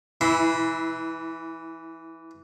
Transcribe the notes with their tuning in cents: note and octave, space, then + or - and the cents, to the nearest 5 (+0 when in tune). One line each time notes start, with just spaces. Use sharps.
E3 +0 E4 -25 C6 -15